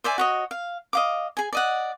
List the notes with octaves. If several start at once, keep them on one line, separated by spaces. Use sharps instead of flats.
C5 D5 E5 G#5
F#4 C#5 D#5
F5
D#5 F5 D6
G#4 G#5
D5 D#5 F#5